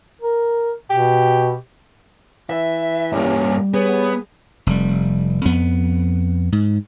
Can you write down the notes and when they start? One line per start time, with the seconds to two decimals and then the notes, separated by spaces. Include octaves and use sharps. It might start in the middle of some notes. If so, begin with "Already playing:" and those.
0.21 A#4
0.90 B2 G4
2.50 E3 E5
3.12 G2 G3 A#3 C#4
3.74 B3 G#4 C#5
4.67 F1 G3
5.45 F2 B3
6.52 G#2